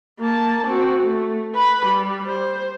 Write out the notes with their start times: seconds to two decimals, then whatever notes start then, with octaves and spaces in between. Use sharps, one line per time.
0.19 A#3 A5
0.67 C4 F#4
1.03 A3
1.55 B4 B5
1.86 G3
2.26 C5